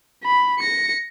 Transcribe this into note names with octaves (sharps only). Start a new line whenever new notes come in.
B5
A#6 C#7